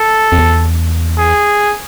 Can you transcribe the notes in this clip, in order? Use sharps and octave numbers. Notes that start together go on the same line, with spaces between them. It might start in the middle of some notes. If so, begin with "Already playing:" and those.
Already playing: A4
F2
E2
G#4